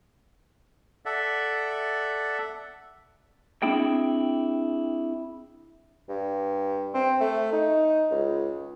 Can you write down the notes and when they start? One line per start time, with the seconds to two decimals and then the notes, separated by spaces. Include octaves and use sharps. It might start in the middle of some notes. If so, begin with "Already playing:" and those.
1.05 A4 D5 E5 F#5
3.62 C4 D4 E4 G#4 G5
6.09 G2
6.94 C4
7.20 A3
7.52 D#4
8.11 C#2